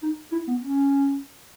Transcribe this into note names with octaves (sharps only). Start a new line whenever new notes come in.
D#4
E4
B3
C#4